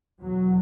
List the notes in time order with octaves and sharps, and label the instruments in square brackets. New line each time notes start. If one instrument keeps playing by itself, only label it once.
[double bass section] E2 B2 F#3